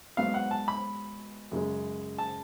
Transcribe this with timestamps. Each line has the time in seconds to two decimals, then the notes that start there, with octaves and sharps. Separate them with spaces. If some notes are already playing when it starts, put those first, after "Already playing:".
0.17 G#2 F#3 B3 F5
0.34 F#5
0.51 A5
0.68 B5
1.52 F#2 C#3 G#3
2.18 A5